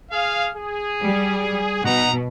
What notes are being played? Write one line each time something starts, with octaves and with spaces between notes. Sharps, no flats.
G#4 F5
G#4
G3
B2 D#4 F#5 A#5